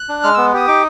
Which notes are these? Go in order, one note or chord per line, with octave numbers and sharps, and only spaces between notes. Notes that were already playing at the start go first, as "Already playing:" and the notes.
Already playing: F#6
D4
G#3 F6
B3 E6
G4 D#6
D#4 D6